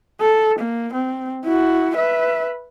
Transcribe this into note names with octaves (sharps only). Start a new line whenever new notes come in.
A4
A#3
C4
E4 F#4
B4 E5